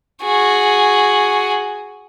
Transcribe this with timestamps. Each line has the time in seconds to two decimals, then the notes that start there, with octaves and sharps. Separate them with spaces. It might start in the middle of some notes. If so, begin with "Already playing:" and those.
0.22 F#4 G#4